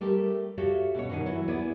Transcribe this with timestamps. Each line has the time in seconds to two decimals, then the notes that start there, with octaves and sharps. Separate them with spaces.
0.01 G3 A3 G4 A4 A#4
0.57 F#4 G4 A4 C#5 E5 F5
0.95 B2 A3 C#4 C#5
1.09 B2 D3 D#3 F#5 G#5
1.26 E3 F#3 E4 C#5
1.48 E2 B3 E4 G#4 D5